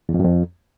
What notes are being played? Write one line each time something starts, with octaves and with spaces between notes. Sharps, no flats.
E2
F2
F#2
F2